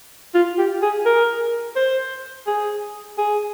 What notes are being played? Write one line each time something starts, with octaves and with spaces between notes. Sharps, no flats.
F4
G4
G#4
A#4
C5
G#4
G#4